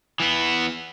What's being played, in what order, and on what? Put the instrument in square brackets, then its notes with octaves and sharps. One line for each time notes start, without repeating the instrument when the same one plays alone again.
[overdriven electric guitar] E3 B3